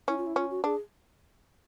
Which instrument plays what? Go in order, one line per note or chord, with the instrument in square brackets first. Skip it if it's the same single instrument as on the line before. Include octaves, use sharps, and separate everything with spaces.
[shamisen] C#4 [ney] E4
[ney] F4
E4
[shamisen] C#4 [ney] F4
[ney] F#4
[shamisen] D4 [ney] G#4